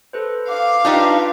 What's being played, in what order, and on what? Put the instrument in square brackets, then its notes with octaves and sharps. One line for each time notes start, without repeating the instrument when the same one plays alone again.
[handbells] A4 B4 C5
[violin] F5 [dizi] D6
[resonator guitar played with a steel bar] D4 D#4 G4 [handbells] F4 B4 E5